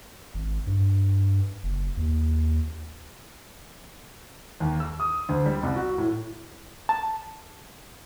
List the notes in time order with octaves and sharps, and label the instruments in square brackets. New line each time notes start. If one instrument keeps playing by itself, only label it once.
[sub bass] G#1
G2
F#1
D#2
[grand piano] D#2
E6
D#6
D2
G3
C2
F#4
A2
[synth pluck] A5